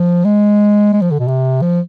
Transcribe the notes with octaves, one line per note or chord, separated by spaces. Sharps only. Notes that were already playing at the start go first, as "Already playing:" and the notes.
Already playing: F3
G#3
G#3
F3
D3
B2
C3
F3